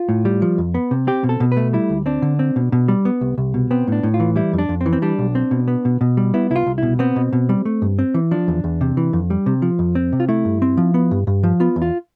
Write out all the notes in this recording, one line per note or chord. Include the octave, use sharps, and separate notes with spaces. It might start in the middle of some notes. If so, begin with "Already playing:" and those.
Already playing: F4
A2
G3
F3
F2
B3
C3
C4 G4
B2
A4
B2
B4
A3
G3 E4
D2
C4 D4
D3
C4
B2
B2
G3
B3
C2
C2
B2
B3 C4
A2 D4
A2
F4
E3
G3 E4
F2
D4
F2
C4
E3
C4
G3 D4
B1
C4
B2
B3
B2
B2
G3
B3 E4
C2 E4
F4
C2
B2 E4
B3 C4
B2
B2
G3
A3
G2
C4
E3
F3 D4
E2
E2
C3
E3
F2
G3
C3
F3
F2
C4
C3
F4
A3 E4
G2
C4
F3
B3
G2
G2
F3
B3 F4
E2
F4